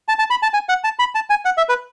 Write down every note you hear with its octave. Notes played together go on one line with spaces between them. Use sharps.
A5
A5
B5
A5
G#5
F#5
A5
B5
A5
G#5
F#5
E5
B4